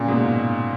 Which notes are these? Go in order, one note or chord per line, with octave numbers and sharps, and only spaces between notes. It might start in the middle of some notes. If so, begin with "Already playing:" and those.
Already playing: A#2 C#3
G#2 B2